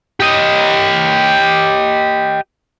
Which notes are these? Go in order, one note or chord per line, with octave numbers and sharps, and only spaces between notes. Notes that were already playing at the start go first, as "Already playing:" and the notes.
G4 D#5